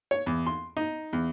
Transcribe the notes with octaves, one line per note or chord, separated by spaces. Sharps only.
C#5
E2
C6
D#4
E2